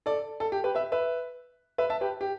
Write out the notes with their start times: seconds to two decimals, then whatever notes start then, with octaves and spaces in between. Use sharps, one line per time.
0.06 A4 D5
0.40 A4
0.52 G4
0.64 G4 B4
0.75 B4 E5
0.92 B4 E5
1.78 B4 E5
1.90 E5 A5
2.01 G4 B4
2.21 G4